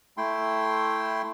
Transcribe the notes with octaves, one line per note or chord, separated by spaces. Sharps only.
A3 E4 G5 C6